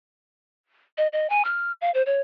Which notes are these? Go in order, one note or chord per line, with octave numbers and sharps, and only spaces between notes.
D#5
D#5
G#5
F6
F5
C5
C#5